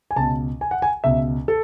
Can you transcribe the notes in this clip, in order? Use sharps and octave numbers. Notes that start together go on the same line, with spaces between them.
G#5
C#2 B2 A5
G#5
F#5
G#5
C#2 B2 E5
A4